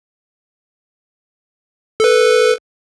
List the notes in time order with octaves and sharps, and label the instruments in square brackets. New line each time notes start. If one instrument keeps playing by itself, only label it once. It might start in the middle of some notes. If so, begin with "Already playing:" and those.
[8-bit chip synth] A4 B4